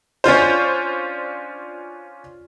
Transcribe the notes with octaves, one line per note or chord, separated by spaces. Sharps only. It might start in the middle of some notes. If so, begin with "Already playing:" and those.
C#4 D4 F4 C5